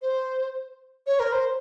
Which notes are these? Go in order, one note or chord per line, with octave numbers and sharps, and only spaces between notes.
C5
C#5
A#4
C5